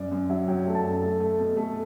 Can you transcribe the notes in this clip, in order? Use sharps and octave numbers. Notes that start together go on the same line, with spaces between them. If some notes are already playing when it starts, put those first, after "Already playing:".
Already playing: F#2 D5
F#2
F#3 E5
F#3 G5
A3
A5
F#2
A3
A3
B2
A3